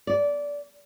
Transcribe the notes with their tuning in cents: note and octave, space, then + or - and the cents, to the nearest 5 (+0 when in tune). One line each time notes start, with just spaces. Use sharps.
D5 -20